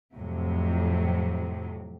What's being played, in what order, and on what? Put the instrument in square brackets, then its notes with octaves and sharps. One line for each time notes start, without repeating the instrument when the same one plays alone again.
[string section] F2 A2 C3 F#3